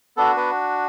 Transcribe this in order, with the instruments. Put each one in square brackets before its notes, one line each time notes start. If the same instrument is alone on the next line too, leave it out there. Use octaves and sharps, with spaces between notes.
[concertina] B3 D4 F#4 A4
B3 B4